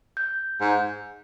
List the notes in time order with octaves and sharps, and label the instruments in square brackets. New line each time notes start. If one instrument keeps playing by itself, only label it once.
[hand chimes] G6
[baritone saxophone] G#2